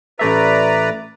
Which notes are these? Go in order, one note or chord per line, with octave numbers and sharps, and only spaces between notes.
A1 A3 B4 D5 E5 A#5